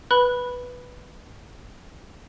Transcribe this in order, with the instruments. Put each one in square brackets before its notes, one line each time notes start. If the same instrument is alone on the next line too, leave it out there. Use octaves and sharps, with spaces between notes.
[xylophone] B4 B5 F#6